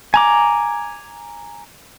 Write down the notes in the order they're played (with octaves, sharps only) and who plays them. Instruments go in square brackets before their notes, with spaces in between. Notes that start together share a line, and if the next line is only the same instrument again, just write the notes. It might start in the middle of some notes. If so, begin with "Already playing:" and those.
[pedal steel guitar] G#5 A#5 D6